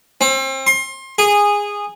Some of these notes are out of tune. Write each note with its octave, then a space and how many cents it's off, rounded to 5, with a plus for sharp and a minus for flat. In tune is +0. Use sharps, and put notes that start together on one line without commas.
C4 +35
C6 +30
G#4 -15